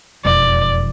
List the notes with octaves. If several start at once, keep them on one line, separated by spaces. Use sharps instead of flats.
E1 F2 D5